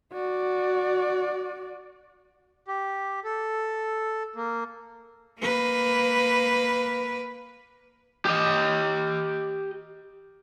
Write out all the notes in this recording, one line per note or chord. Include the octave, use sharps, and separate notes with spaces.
F#4 D5
G4
A4
A#3
A#3 B4
G4 D#5